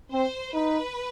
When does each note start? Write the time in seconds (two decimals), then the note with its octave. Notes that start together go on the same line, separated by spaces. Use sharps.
0.12 C4 C5
0.54 D#4 B4